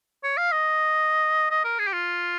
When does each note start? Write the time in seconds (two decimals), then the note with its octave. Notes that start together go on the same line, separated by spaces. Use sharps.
0.24 C#5
0.38 F5
0.52 D#5
1.51 D#5
1.65 A#4
1.79 G#4
1.87 G4
1.93 F4